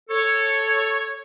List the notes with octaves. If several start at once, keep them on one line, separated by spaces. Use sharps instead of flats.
A4 C#5